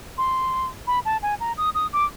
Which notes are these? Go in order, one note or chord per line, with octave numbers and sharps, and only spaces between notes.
C6
B5
A5
G#5
A#5
D#6
D#6
D6